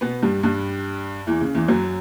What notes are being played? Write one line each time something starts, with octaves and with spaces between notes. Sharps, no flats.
B2 B3
G2 G3
G2 G3
E2 E3
C#3
E2 E3
F#2 F#3